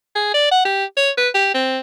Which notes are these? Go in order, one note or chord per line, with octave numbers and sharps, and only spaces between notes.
G#4
D5
F#5
G4
C#5
B4
G4
C4